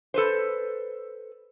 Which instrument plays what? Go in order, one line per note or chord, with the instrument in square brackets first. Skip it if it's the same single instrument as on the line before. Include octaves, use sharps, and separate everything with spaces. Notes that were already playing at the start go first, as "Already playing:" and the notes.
[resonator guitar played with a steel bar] A4 B4 C5